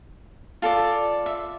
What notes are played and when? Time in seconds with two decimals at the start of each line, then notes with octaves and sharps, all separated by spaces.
0.62 F4 A4 D5
1.26 E5